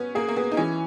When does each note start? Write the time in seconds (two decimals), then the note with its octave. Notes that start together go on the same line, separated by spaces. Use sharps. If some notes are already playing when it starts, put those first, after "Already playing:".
Already playing: B3 C#4
0.15 A#3 G#4
0.28 A#3
0.36 B3 G#4
0.52 D#4
0.57 E3 C#4